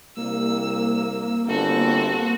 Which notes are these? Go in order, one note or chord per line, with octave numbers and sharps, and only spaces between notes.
C2 A#3 E6
G1 C4 F#4 A4